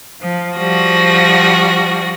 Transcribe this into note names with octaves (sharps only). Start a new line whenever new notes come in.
F3
F3 G3 F#4 A#6